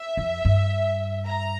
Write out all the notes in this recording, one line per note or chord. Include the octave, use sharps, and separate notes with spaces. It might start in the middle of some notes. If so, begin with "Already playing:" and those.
Already playing: E5
F2
G2
A#5